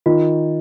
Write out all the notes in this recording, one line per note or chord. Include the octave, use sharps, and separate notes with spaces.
D#3 F4